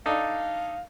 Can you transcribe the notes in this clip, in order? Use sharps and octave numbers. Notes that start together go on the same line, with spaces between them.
D4 D#4 A4 F5